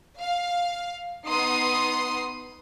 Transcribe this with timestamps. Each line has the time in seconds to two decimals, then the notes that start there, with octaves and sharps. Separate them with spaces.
0.21 F5
1.28 B3 D#4 C6 D#6 C7